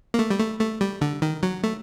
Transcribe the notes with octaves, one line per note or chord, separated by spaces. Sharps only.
A#3
A3
G3
A3
A3
G3
D3
D#3
F#3
A3